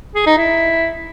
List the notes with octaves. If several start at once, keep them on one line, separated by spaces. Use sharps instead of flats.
G#4
D#4
E4